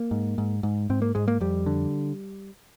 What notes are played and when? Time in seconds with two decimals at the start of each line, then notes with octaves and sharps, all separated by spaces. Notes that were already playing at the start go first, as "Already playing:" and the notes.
Already playing: A#3
0.11 G#2
0.38 G#2
0.63 G#2
0.90 G#2 C4
1.02 A#3
1.15 G#2 G#3
1.28 A#3
1.40 F2 G3
1.66 D3